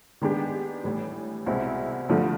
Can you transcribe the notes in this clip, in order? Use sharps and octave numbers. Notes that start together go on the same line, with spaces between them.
D#3 G#3 B3 D4 G4
A2 E3 G3
C2 B2 G#3 C4 E4
G2 D3 F3 A3